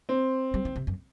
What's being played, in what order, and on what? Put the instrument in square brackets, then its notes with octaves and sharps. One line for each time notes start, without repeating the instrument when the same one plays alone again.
[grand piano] C4
[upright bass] G3
D#3
C3
F#2